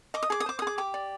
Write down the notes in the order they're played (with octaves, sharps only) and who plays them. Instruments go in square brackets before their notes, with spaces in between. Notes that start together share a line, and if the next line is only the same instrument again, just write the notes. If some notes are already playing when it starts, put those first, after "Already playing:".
[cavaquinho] D#5 D6
D#6
G#4 D6
D#6
C5 D6
D#6
G#4 D6
G4 D6
D5